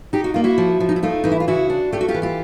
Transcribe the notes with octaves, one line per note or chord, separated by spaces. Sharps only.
D#4 G4
F#4
A#3 F4
E4 F#4
F3
F3
D#4
E4
A3 D#4 F4
E3 D#4
E4
F4
C#3 E4 F#4
D4
A3 G4
F#4
F4 G4
E3
F4 G4